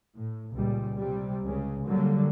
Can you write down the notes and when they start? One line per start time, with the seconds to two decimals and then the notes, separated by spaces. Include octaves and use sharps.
0.16 A2
0.54 C#2 A#2 G3
0.97 C3 G3
1.43 C#2 C#3
1.87 D3 F#3 G3 A#3